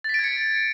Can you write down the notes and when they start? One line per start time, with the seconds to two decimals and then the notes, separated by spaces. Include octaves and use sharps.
0.04 A6
0.09 B6
0.14 D7
0.19 G#6
0.24 C#7